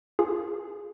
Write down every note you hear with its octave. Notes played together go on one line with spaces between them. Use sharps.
F4 G#4